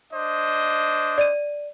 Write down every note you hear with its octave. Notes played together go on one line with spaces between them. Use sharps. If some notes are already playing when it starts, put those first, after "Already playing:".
D4 C5 D#5
D5 D#7